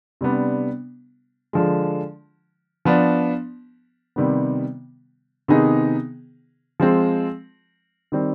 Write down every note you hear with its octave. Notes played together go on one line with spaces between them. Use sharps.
C3 G3 B3 D4
D3 F3 G#3
F3 B3 D4
C3 D#3 G3 B3
C3 D#3 B3 D#4 G#4
F3 G#3 C4
D#3 G3 C4